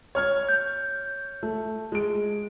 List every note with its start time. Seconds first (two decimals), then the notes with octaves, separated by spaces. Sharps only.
0.15 C#5 F6 G#6
0.49 G6
1.43 A3
1.92 G#3 D7